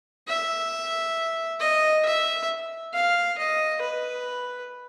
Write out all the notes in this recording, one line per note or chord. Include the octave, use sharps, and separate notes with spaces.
E5
D#5
E5
F5
D#5
B4